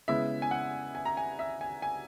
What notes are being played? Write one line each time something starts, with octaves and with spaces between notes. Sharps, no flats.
C#3 G#3 B3 E4 E5
G#5
F#5
G#5
A#5
G#5
E5
G#5
G#5